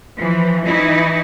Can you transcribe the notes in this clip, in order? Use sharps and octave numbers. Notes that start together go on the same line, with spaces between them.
E3 F3
E3 D#4 E4